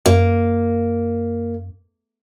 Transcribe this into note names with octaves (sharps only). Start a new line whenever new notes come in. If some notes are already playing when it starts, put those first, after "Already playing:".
F#2 A#3